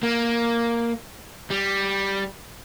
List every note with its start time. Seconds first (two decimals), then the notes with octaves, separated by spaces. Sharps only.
0.03 A#3
1.50 G3